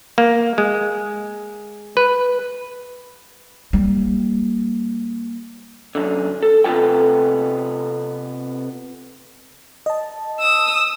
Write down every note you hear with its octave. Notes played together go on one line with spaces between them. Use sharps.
A#3
G#3
B4
G3 A#3
F#2 D3
A4
C3 B3 F4 A4 G5
D#5 A5
D#6 E6